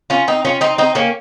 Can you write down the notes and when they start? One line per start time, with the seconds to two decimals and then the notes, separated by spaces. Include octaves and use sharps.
0.10 C#4 F4
0.28 C4 D#4
0.45 C#4 F4
0.61 C4 D#4
0.78 C4 D#4
0.95 A#3 C#4